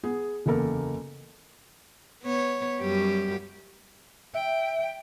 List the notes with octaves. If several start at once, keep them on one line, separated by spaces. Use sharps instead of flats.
B3 G#4
F#1 E2 A#3 A4 A#4
B3 C#5
F#2 G3 G4
E5 G5